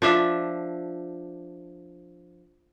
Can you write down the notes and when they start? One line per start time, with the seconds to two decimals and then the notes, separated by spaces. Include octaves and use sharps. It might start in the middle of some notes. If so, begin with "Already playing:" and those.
0.02 F3 D4 E5